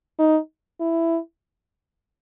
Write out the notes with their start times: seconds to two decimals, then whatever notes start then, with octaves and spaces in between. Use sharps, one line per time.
0.19 D#4
0.81 E4